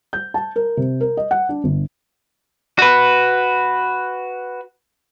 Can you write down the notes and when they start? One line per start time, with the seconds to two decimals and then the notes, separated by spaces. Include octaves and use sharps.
0.13 G6
0.34 A5
0.56 A#4
0.77 C3
1.01 A#4
1.17 D#5
1.31 F#5
1.49 D4
1.64 G1
2.79 F#4 B4